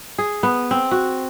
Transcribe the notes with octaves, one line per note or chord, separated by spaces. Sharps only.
G#4
B3
C4
F#4